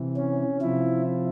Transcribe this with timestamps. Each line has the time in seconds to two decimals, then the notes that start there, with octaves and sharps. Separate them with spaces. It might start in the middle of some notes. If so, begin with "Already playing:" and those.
Already playing: C3 E3
0.17 C#4
0.62 C3 F3 E4